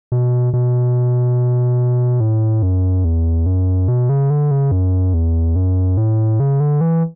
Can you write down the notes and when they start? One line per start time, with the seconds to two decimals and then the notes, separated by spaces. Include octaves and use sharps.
0.12 B2
0.53 B2
2.20 A2
2.63 F#2
3.05 E2
3.46 F#2
3.88 B2
4.09 C#3
4.30 D3
4.51 C#3
4.72 F#2
5.14 E2
5.56 F#2
5.97 A2
6.40 C#3
6.60 D3
6.81 E3